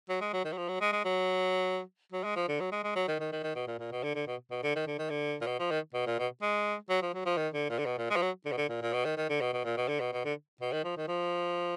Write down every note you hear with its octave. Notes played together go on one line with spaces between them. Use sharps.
F#3
G#3
F#3
D#3
F#3
F3
F#3
G#3
G#3
F#3
F#3
G#3
F3
D3
F#3
G#3
G#3
F#3
D#3
D#3
D#3
D#3
B2
A#2
A#2
B2
D3
D3
B2
B2
D3
D#3
D3
D#3
D3
A#2
B2
F3
D#3
B2
A#2
B2
G#3
F#3
F3
F#3
F3
D#3
D3
A#2
D3
B2
A#2
G#3
F3
F#3
D3
B2
D3
A#2
A#2
B2
D#3
D#3
D3
B2
B2
A#2
B2
D3
B2
B2
D3
B2
D#3
F3
D#3
F3